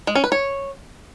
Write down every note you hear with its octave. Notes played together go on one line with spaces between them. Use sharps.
G#3
C#4
B4
C#5